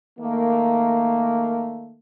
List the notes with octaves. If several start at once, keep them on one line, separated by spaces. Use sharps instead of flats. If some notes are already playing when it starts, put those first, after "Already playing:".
D#3 A3 A#3